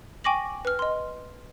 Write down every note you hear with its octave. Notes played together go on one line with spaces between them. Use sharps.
G5 G#5 C#6 D6 A#6 F#7
B4 F6
D#5 C6